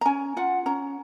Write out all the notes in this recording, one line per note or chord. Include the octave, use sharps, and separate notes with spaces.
A#5
C#4 G#5
F4 F#5
C#4 A#5